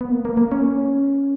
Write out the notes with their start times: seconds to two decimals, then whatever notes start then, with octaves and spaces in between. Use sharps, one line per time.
0.01 B3
0.11 A#3
0.25 A#3
0.37 A#3
0.51 C#4